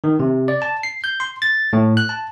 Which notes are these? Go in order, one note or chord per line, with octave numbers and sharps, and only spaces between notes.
D#3
C3
D5
A5
C7
G6
C6
A6
A2
F#6
A5